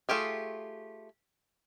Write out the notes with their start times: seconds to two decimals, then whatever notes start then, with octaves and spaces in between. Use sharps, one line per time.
0.09 A3 F4 G4 G#4